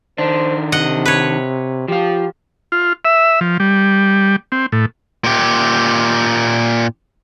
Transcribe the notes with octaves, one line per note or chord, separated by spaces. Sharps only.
D#3 D4 C5
C3 D#5 F#5
B4 C#5
F3 F4 G4
F4
E5
F3
G3
C4
A2
A#2 G4